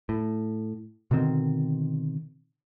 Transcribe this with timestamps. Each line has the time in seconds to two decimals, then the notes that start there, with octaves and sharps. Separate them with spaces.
0.09 A2
1.11 B2 D3 D#3 C4